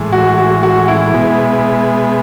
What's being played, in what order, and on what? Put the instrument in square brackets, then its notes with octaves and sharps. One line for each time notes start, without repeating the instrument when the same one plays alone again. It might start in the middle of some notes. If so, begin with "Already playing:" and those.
Already playing: [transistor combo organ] A2 E3 G#3
[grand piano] F#4
F#4
F#4
E4
[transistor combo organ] B2 G#3 B3